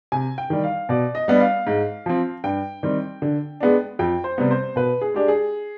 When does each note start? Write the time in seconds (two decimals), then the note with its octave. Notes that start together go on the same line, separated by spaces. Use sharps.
0.12 C3 G#5
0.38 G5
0.50 D#3 G3
0.64 F5
0.89 B2 D5
1.15 D#5
1.28 G3 B3 D4
1.40 F5
1.67 G#2
2.06 F3 C4
2.44 G2 G5
2.83 D#3 G3 C4
3.22 D3
3.60 G#3 B3 D4
3.99 F2 G5
4.24 C5
4.38 C3 G3 B3
4.51 C5
4.76 B2 B4
5.01 G#4
5.14 G#3 D4 G4
5.28 G#4